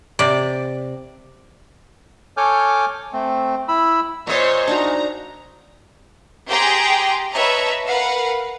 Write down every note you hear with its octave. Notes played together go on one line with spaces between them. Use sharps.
C3 D5
A4 C#5 G#5 D6 F6 G6
A3 C4
E4 B5 E6
A#2 C5 C#5 D#5
D4 D#4 F#4 A#5
G4 G#4 G5 A#5 C6
B4 C#5 D#5 E5 A5 A#5
A#4 B4 F5 F#5